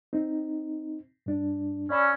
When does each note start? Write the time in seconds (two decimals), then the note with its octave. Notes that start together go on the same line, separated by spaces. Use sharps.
0.13 C4 D#4
1.26 G2 D4
1.90 C#4 D5 B5 E6